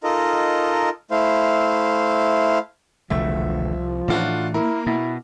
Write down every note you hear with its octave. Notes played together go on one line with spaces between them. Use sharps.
D#4 F4 A4 A#4 D#5
A3 E4 C5 F5
E1 C2 D3 F3 A3 E5
A2 E3 D4 F4 F#4
A#3 E4 A#4
B2 E4